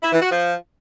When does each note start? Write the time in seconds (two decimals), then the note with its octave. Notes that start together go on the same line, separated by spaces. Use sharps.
0.03 E4
0.13 E3
0.22 F#4
0.31 F3